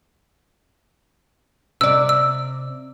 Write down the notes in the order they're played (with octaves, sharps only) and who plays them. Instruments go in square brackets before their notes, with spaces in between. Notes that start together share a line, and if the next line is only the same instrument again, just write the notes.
[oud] C3 D5 [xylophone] E6
[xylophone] E6